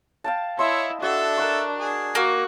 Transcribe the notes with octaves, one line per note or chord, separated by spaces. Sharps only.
F5 G5 A5
E4 C#5 D#5 E5 C6
D4 F#4 A4 E5
A#4 F#5 C#6
G#4
A#3 F#4